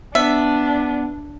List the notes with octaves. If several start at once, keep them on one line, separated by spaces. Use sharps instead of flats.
B3 D4 E5